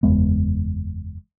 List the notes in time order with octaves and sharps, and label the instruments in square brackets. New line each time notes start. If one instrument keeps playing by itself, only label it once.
[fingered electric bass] F#1 E2 G#3 B3